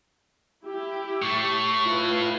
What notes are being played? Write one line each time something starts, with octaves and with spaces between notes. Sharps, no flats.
E4 G4
A2 A3 C#6
E4 F4 B4